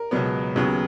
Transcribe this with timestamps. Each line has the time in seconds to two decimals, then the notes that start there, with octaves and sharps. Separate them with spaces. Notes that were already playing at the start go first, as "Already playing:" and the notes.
Already playing: A#4
0.11 C#2 B2 F#3 B3
0.56 D#2 C#3 F#3 B3